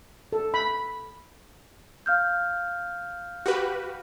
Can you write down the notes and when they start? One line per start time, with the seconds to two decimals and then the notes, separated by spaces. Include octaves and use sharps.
0.33 A4
0.54 B5
2.06 F5 F6 G6
3.46 F#4 G4 B4